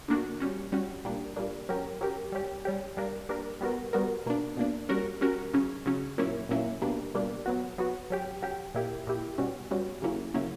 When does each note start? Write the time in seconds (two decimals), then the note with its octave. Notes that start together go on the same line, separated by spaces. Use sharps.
0.08 D3 A#3 D4 F#4
0.40 G3 C#4 F#4
0.72 G3 C#4 F#4
1.05 A#2 G3 A#3 D4
1.36 A#2 G3 A#3 D4
1.69 F#3 C#4 G4 A#4
2.01 F#3 C#4 G4 A#4
2.32 G3 C#4 G4
2.65 G3 C#4 G4
2.97 G3 A#3 D4 A#4
3.29 G3 A#3 D4 A#4
3.61 G3 B3 F#4 A#4
3.93 G3 B3 F#4 A#4
4.26 B2 A#3 D4
4.57 B2 A#3 D4
4.89 G3 C#4 F#4 A#4
5.21 G3 C#4 F#4 A#4
5.53 C#3 F#3 C#4
5.86 C#3 F#3 C#4
6.18 A#2 F#3 A#3 C#4 E4
6.49 A#2 F#3 A#3 C#4 E4
6.82 B2 G3 A#3 D4
7.14 B2 G3 A#3 D4
7.46 F#3 B3 F#4
7.78 F#3 B3 F#4
8.10 F#3 C#4 G4
8.42 F#3 C#4 G4
8.74 A#2 A#3 E4 G4
9.07 A#2 A#3 E4 G4
9.38 B2 G3 C#4 F#4
9.71 B2 G3 C#4 F#4
10.02 C#3 F#3 A#3 C#4 E4
10.34 C#3 F#3 A#3 C#4 E4